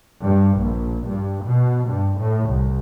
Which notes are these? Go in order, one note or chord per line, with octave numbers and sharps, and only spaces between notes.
G2
A#1
G2
B2
G2
A2
C2